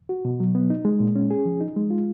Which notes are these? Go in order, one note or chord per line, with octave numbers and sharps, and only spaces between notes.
F#4
B2
F#3
B3
D#4
G#3
A#2
C#4
G#4
F3
D#4
G#3
F4